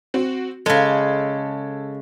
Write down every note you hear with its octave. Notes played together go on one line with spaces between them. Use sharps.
C4 F#4
C#3 G#3 A4